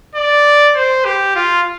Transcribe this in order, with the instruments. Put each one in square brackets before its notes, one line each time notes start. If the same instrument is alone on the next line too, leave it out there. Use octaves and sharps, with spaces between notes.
[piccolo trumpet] D5
C5
G4
F4